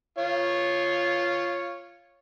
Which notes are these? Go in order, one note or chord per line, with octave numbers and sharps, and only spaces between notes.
F4 C#5